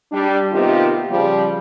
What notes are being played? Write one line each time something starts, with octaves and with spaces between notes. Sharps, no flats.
G3 D4
C3 D#3 A#3 B3 F4 G4
C#3 F3 G3